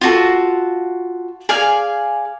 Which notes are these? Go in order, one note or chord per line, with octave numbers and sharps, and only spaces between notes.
F4 F#4 A4
G#4 D5 F5 G#5